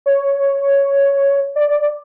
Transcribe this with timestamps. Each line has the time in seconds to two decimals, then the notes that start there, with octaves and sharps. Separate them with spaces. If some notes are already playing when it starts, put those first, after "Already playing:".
0.06 C#5
1.56 D5